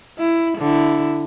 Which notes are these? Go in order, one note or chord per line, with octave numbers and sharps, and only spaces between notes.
E4
D3 E4